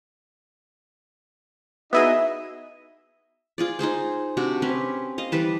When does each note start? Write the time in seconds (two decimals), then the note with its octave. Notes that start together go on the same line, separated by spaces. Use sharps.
1.93 B3 D#4 E4 F#4 G#4 D#5 E5
3.58 F4 G#4 D5
3.79 D#4 F4 G#4 C5
4.37 C3 D4 F#4
4.62 C4 C#4 G4 B4
5.18 D#5 F5
5.32 E3 G3 B4 A5